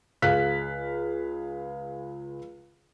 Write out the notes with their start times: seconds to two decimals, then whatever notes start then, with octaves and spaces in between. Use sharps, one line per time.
0.22 C#2 G#4 F5 F#6 B6